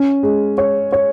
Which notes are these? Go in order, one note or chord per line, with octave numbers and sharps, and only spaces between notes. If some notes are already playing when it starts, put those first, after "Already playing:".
Already playing: C#4
G#3
C#5
C#5